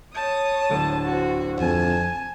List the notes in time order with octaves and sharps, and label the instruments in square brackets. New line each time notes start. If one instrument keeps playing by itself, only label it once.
[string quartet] C#5 D#6 [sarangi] A5
[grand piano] D1 D3
[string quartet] C4 F#4
[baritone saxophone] F2 [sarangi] G#5 [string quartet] A5